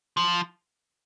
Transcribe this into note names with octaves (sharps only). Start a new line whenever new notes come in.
F3